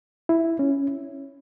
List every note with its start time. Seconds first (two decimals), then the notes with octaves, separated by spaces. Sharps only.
0.29 E4
0.59 C#4